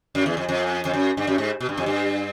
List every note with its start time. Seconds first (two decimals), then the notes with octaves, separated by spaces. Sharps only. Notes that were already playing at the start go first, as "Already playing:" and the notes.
0.15 F#2
0.26 E2
0.37 F2
0.49 F2
0.85 F2
0.93 F#2
1.17 G2
1.27 F#2
1.38 G#2
1.60 B2
1.69 G2
1.78 F2
1.86 G2